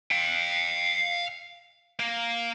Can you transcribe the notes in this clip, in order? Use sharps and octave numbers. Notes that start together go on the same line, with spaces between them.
F5 G5
A#3